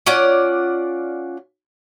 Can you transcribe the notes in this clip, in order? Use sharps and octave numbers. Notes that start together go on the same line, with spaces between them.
C#4 F4 D5 F#5